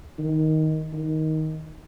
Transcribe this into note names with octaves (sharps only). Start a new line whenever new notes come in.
D#3
D#3